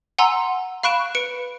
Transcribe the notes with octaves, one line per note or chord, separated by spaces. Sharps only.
F#5 G#5 A#5 C6 E6
F5 B5 C#6 F#6 D7 E7
B4 C#7 D7